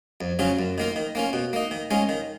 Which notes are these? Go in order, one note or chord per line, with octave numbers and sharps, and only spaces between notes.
F2
C#3 F#3 C#4 F4
F#2
D#3 A#3 F4
D#3
A#3 C#4 F4
B2
A#3 D#4
D#3
G#3 C#4 F4
D#3